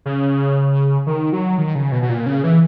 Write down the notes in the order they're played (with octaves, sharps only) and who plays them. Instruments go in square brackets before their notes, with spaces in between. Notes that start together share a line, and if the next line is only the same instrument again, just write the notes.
[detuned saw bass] C#3
D#3
F#3
D#3
C#3
B2
B2
A#2
C#3
E3